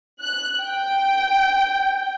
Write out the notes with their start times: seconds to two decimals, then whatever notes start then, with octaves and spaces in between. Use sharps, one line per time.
0.21 F#6
0.63 G5